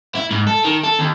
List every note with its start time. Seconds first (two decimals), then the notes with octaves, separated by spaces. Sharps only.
0.15 E4
0.31 G#2
0.47 A4
0.65 D#3
0.84 A4
1.00 D#2